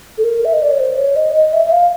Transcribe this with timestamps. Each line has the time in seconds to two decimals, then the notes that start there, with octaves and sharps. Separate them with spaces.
0.18 A4
0.24 A#4
0.45 E5
0.53 D#5
0.62 D5
0.71 C#5
0.80 C5
0.98 C#5
1.16 D#5
1.35 D#5
1.53 E5
1.66 E5
1.72 F5